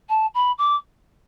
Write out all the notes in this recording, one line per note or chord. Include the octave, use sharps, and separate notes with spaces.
A5
B5
D6